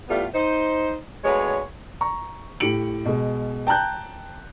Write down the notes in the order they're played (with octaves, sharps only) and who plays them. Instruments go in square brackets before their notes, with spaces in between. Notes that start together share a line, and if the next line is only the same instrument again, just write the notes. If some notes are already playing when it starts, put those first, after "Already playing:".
[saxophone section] A2 G3 A3 B3 F4
D#4 C5
D2 G#3 B3 C#5
[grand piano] A#5 C#6
A2 G4 C#7 D7 F#7
B2 G#3
G5 A5 A#5 F#6 G6